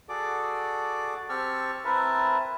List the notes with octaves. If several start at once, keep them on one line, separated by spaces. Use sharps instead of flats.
F#4 G#4 A4 D5 D6
C4 G4 A5 C#6 E6 F6
C4 E4 A#4 B4 E5 A5